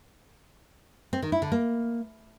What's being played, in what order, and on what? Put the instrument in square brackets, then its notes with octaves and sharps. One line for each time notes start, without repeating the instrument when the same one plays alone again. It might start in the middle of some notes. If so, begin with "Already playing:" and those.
[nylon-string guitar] C4
D#3
E4
D3
A#3